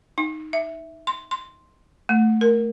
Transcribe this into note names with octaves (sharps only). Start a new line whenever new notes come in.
D#4
E5
C6
C6
A3
A#4